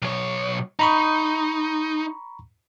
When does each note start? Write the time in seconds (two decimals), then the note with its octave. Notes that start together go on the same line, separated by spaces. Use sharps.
0.02 B1 C#5
0.79 D#4 A#5 B5 C#6